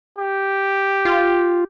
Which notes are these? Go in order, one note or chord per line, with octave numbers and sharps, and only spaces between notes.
G4
F4